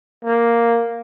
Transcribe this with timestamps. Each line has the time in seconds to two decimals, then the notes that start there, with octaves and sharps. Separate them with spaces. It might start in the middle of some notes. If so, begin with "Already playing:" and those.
0.25 A#3